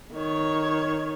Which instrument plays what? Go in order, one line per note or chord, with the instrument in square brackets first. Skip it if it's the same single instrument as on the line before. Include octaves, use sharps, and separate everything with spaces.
[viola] D#3 C#5